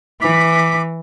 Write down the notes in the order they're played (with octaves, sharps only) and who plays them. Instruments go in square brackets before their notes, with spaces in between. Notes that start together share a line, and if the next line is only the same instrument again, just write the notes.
[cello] E3 [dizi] D6 [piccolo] B6